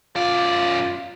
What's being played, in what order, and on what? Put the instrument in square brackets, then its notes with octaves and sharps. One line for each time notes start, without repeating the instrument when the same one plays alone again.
[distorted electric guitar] F#2 D5 [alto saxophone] F4